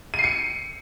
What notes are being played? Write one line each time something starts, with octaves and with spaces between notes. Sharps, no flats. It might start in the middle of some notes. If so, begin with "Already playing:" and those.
D#7
C7
C#7